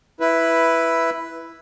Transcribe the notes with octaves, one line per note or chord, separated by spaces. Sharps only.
E4 B4